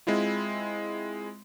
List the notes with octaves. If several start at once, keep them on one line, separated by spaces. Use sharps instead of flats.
G#3 C4 E4 F4